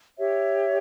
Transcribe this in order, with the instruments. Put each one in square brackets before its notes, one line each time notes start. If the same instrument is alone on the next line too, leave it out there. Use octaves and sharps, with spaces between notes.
[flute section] G4 C#5 E5